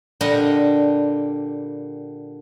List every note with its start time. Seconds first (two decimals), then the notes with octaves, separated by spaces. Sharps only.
0.21 A#2 D3 G3 D4 D#5